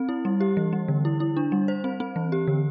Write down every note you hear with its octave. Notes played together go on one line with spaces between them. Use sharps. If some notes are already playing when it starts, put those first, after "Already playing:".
Already playing: C4
E4
G3
G4
E3
G3
D3
E4
E4
D4
G3
C5
C4
C4
E3
G4
D3